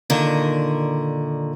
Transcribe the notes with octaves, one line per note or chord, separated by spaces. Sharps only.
A#2 D3 D#3 A#4